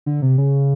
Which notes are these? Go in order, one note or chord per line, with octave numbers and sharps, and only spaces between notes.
D3
C3
C#3